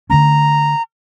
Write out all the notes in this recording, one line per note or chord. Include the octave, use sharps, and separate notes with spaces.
D3 F#3 A3 C#4 A#5